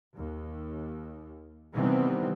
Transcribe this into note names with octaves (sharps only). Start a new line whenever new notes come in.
D#2
C3 D#3 E3 G3 B3 C4